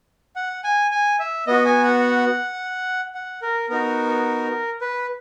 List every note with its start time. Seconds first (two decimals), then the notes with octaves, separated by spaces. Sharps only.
0.36 F#5
0.64 G#5
0.91 G#5
1.19 E5
1.47 B3 F#4 D#5
1.65 G#5
1.84 F#5
3.15 F#5
3.42 A#4
3.69 B3 D#4 F#4 A#4
4.81 B4